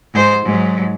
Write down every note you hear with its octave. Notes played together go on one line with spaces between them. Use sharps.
G#2 C5
G#2 F#3